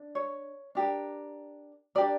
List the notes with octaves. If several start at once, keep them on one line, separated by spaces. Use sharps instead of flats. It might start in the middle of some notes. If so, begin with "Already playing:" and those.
Already playing: D4
C#5
D4 G4 A#4
D4 G4 A#4 D5